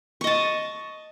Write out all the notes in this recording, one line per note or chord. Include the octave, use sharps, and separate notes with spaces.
D#5 A5 C#6